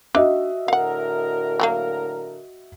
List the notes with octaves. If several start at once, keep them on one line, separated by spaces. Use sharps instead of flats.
D4 D#4 F#4 D#5 E5
A2 D3 A#4 F5 F#5
F#3 G3 A#3